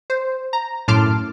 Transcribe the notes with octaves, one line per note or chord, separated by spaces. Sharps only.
C5
A#5
F#2 A2 A5 C6 D6 F6